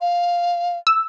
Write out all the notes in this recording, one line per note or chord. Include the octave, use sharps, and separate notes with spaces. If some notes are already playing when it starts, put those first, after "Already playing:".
F5
E6